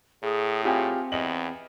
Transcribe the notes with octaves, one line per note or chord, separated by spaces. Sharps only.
A2 G#4
C4 F4 G4 G#4
E2 D#5 F#7